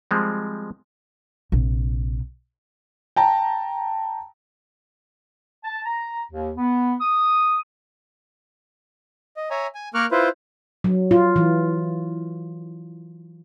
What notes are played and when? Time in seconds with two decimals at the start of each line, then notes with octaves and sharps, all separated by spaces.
0.11 F3 G3 G#3 C4
1.52 A#1 C3
3.16 G5 A5 A#5
5.64 A5
5.85 A#5
6.32 D#2
6.58 B3
7.01 D#6
9.37 D#5
9.50 C#5 E5 G#5 A#5
9.75 G#5
9.94 A#3 A#4 C#6 D6 F6 F#6
10.11 E4 F4 B4 C5
10.84 F#3
11.11 F4
11.36 E3